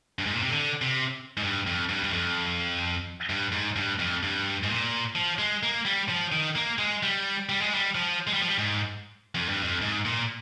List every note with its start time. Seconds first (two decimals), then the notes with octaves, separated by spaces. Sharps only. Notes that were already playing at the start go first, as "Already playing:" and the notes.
0.19 G2
0.26 G#2
0.34 A#2
0.42 C3
0.50 D3
0.82 C3
1.37 G#2
1.43 G2
1.67 F2
1.89 G2
2.04 G2
2.13 F2
3.30 G2
3.52 G#2
3.76 G2
3.99 F2
4.23 G2
4.63 G#2
4.69 A#2
5.15 F3
5.39 G#3
5.63 A#3
5.85 G3
6.09 F3
6.32 D#3
6.55 A#3
6.79 G#3
7.03 G3
7.49 G3
7.61 G#3
7.74 G3
7.95 F3
8.27 G#3
8.33 G3
8.41 F3
8.49 G3
8.58 G#2
9.35 F2
9.49 G2
9.63 F2
9.82 G#2
10.05 A#2